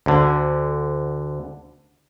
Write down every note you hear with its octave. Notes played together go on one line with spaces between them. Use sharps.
D2 D3